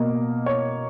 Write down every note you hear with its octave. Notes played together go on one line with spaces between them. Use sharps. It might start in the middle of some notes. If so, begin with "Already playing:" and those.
Already playing: B2 A#3 D#5
C#5